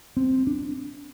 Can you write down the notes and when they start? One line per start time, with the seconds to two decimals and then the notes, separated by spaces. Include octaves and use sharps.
0.17 C4
0.47 D4